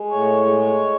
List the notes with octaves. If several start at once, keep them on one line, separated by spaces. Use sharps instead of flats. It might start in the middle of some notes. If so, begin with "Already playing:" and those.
Already playing: G#3
A2 C#5
G#3